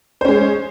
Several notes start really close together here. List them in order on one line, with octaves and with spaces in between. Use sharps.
C5 C#4 G#3